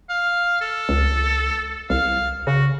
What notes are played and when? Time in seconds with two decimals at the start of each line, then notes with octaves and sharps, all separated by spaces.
0.10 F5
0.61 A4
0.89 C#2
1.90 C2 F5
2.47 C#3 F#4